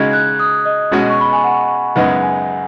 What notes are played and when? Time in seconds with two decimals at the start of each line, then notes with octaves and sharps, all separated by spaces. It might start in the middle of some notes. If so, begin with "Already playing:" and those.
Already playing: C#3 G#3 D#4 F#4 G#6
0.13 F#6
0.39 D#6
0.65 D#5
0.92 B2 G#3 C#4 F#4
1.10 C#6
1.21 B5
1.32 G#5
1.44 F#5
1.96 F#2 C#3 G#3 B3 D#4 F#5
2.22 G#5